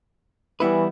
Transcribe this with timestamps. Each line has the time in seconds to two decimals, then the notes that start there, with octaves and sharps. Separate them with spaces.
0.60 E3 G3 B3 E4 B4